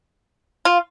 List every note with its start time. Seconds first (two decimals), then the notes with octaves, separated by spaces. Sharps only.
0.65 F4